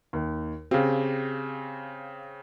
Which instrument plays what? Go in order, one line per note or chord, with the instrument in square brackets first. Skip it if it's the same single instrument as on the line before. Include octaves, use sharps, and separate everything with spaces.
[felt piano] D#2
[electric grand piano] C#3 C4 [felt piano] G4 G#4 F5